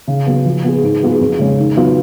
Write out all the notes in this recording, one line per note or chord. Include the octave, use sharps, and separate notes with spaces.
C#3
F#3 B3
F3
B3 F4 G#4
G#2
F#3 B3 F4 G#4
F2
C#3 G#3 C#4
D#3
F#3 B3 F4